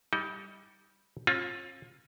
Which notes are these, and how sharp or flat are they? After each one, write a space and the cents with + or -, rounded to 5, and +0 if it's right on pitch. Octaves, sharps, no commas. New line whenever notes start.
G3 +0 D#4 +30 G5 -25
C#4 -45 F4 +15